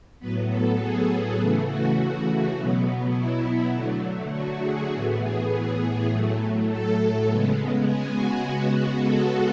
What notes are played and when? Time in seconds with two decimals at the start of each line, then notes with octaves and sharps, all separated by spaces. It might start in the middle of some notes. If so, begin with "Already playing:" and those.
0.19 A2 F#3 B3 B4
0.48 A4
0.78 G#4
1.37 C#3 E3 A3 F#4
1.66 F#4
1.95 F#4
2.55 B2 F#3 B3
3.14 E4
3.73 D3 F#3 A3
4.31 F#4
4.61 G#4
4.91 A2 E3 B3 F#4
5.20 G#4
6.09 A2 F#3 A3
6.68 A4
7.27 C#3 G#3 B3
7.85 G#4
8.14 F#4
8.44 C#3 G#3 B3 F#4
9.02 A4